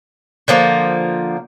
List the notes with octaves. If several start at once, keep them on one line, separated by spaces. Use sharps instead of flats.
D3 F3 A#3